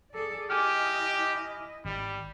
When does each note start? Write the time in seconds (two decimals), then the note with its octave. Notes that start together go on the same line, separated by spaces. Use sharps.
0.14 G#4 A4 D5
0.50 E4 G4 D#5 G#5 D6 F6
1.85 G#1 G3